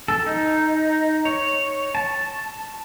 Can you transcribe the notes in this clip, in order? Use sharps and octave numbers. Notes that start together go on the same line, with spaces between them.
A4
D#4
C#5
A5